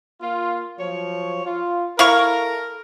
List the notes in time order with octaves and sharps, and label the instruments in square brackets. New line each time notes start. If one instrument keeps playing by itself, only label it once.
[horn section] A#3 F4
F3 F#3 C#5
F4
[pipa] E4 F5 C#6 [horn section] A4 A#4